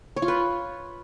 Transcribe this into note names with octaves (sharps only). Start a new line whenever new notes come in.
C#5
F4
B4